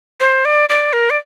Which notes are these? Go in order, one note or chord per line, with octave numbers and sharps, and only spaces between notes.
C5
D5
D5
A#4
D5